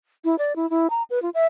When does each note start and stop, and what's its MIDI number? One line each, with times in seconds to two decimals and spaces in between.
0.25 0.36 64
0.39 0.56 74
0.56 0.69 64
0.70 0.87 64
0.90 1.03 82
1.10 1.22 71
1.22 1.30 65
1.34 1.46 76